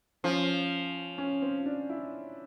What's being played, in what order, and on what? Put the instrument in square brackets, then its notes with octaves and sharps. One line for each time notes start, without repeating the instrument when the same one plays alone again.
[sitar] F3 [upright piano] C#4
[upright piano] C#4
C4
D4
E4